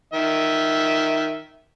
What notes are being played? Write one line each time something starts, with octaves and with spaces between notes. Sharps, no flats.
D#3 E5